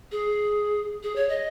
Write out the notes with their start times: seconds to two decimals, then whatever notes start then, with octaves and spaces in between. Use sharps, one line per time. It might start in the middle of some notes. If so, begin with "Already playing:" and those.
0.12 G#4
1.03 G#4
1.16 C#5
1.29 D#5